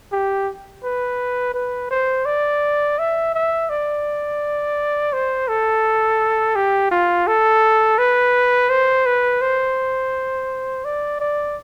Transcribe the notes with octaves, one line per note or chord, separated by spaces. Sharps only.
G4
B4
B4
C5
D5
E5
E5
D5
C5
A4
G4
F4
A4
B4
C5
B4
C5
D5
D5